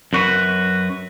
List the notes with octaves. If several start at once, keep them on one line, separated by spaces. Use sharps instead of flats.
F#2 F#4 B4